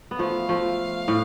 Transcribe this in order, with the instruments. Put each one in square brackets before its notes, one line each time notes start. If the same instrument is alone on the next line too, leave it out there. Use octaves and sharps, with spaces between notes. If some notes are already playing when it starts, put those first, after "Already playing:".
[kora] B3
[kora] F3 A3 [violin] F5
[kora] F3 A3
A2